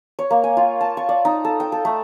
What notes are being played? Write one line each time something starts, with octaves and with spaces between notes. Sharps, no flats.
C#5
A#3
G#5
F4
A5
C#6
D5
D#4
A4
G5
A4
A3